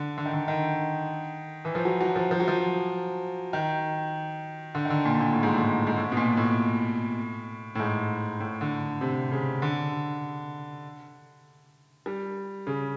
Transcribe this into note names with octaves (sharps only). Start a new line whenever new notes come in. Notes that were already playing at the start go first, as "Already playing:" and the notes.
Already playing: D3
D3
D#3
D3
D#3
E3
F3
F#3
F#3
F3
F3
F#3
F3
D#3
D3
D#3
D3
A#2
A#2
A2
G#2
A2
G#2
A2
B2
A#2
A2
A2
G#2
A2
D3
C3
C#3
D3
G3
C#3